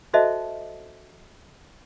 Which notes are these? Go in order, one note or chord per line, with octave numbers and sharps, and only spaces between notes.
F#4 A4 C5 D#5 E5 A5